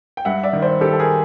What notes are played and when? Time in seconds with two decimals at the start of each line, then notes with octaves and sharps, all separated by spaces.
0.17 G5
0.25 G2 E5 F#5
0.43 D5 E5
0.53 D#3
0.62 C5 D5
0.81 D#3 G4 A4
0.93 A4
1.00 G#4 A#4